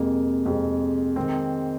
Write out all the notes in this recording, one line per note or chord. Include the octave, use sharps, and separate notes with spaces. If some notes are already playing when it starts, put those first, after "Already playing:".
Already playing: F2 C3 G#3 A#3
F2 C3 G#3
D#3 G#3 C4